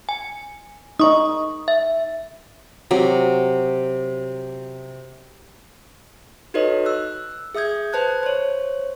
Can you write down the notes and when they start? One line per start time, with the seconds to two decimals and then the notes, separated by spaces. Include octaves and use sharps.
0.09 G#5
1.00 D#4 D#5 C#6 D#6
1.68 E5
2.91 C3 F#3
6.54 D#4 F#4 A4 B4 C#5 D#5
6.86 E6 F#6
7.55 G#4 E5 D#6 G6 G#6
7.93 B4 C5 A5 F#6 G#6
8.23 C5 C#5